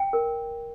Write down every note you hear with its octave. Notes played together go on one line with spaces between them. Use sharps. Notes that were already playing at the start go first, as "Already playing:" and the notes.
Already playing: G5
A#4